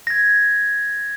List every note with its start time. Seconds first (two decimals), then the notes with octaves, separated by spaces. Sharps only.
0.07 G#6 A#6